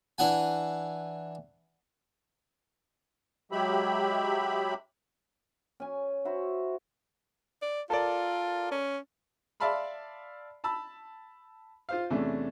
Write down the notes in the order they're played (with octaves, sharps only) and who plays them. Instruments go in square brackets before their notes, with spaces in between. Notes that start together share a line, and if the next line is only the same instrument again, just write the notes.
[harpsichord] E3 D4 F#5 G#5
[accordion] F#3 G#3 G4 E5 B5
[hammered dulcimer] C#4 G#5
E4 F#4 C5
[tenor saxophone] D5
[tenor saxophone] F4 [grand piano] A4 A#4 D5
[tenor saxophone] C#4
[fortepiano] D5 E5 F5 A5 B5 C6
A5 B5 E6
F4 C5 F5
E2 C3 A3 C#4 D4